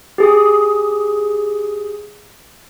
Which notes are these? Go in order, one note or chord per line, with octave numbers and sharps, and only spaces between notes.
G4 G#4 D#6